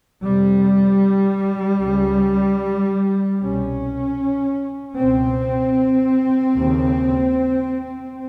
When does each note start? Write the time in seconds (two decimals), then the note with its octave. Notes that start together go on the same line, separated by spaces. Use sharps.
0.23 F2 C3 G3
1.81 C#2 C#3
3.39 C2 B2 C#4
4.96 C#2 B2 C4
6.55 D#2 C#3